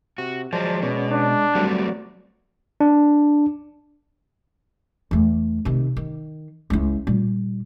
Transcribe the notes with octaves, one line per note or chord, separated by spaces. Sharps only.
C3 F#4
F3 F#3 G#3 C5 D5 A5
B2 B3 C#4 D5
D4
F#3 G3 A3 B3 C4 D5
D4
E2 A3
C3 D#3
D#3
C#2 E4
A#2 G3